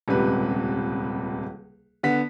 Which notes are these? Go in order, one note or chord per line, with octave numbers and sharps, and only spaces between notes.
D#1 C#2 C3 B4
D3 B3 B6